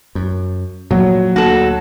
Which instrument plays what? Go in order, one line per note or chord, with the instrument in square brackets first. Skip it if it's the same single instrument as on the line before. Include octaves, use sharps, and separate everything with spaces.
[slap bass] F#2
[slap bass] A#2 F3 [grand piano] F#3
[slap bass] D2 A#3 [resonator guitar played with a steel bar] F#4 A4